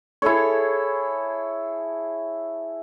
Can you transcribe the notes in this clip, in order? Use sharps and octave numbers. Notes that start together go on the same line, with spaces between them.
E4 G#4 A4 C#5